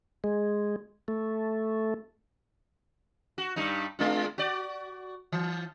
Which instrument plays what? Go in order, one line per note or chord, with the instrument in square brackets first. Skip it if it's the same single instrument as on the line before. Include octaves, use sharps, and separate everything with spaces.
[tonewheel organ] G#3
A3
[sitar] F#4
G2 G3 D#4
G#3 D4 F4
F#4 D5
E3